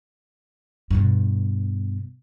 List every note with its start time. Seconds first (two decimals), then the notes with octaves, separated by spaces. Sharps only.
0.91 G2 B2